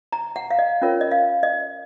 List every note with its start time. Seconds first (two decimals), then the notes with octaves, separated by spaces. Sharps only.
0.12 A#5
0.36 F#5
0.51 F5
0.59 D#5
0.82 C#4 F4 A#4 C#5
1.01 D#5
1.11 F5
1.43 D#5